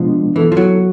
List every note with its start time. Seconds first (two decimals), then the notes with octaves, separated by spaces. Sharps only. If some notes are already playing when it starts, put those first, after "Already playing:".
Already playing: B2 F3 G#3 B3 D4
0.36 E3 B3 E4 A4
0.52 F3
0.57 F#3